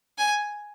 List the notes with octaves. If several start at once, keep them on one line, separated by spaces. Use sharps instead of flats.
G#5